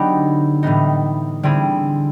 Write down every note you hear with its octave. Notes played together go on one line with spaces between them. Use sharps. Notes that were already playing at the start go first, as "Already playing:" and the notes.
Already playing: D3 F#3 B3 D#4 G4
A2 E3 G3 B3 D#4
D3 G3 C4 E4 G#4